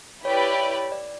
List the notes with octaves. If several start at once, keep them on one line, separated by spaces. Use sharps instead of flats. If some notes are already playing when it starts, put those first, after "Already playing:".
E4 G4 B4 C#5 D5 G5
D5